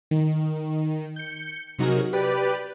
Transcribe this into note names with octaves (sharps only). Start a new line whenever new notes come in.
D#3
G6 C#7
C3 F#3 D#4 F#4 G#4 A#4
G4 B4 D5